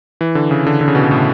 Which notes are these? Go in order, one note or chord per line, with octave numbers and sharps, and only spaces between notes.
E3
D3
C#3
D3
D3
C#3
B2
C#3
A2